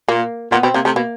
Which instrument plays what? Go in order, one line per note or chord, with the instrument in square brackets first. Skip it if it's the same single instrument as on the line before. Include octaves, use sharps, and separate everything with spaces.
[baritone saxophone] A#2 [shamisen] A#3
[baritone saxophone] A#2 [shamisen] B3
[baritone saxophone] B2 [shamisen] C4
[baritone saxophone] C3 [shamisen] A#3
[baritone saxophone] C3 [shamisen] A3
[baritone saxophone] B2 [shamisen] A#3